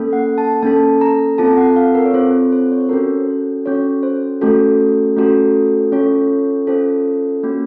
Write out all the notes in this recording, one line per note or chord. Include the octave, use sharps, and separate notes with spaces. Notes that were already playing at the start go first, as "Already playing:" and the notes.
Already playing: A#3 C#4 A4
F#5
A5
A#3 C#4 A4 A5
A#5
C4 F4 A4 A5
F#5
F5
A#4
C#5
C4 F4 A4 C5
C5
C#5
C5
C#4 F#4 A4 A#4
C5
C#4 F#4 A4 C#5
C5
A3 C#4 F#4 A4
A3 C#4 F#4 A4
C#4 F4 A4 C#5
C#4 F4 A4 C5
A#3 C#4 F#4